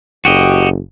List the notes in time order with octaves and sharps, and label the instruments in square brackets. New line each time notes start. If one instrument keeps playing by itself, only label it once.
[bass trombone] F#1 [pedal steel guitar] F#4 G4 D#5